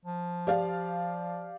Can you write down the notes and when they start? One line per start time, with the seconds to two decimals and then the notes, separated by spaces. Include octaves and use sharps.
0.05 F3
0.47 G4 D5 F5